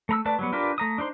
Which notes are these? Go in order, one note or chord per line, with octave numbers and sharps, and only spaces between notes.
A3 A#5 E6
A3 B4 D5 A5
F#3 G3 B3
D4 F4 G4 A#4 B4
A3 A#5 D#6
D4 D#4 C5 C6